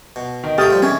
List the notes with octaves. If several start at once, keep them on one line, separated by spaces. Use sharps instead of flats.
B2
D#3
G#2 A3 G4 G5 D#6 F6 A6
F3 G3
D#3 E3 C#4 G#4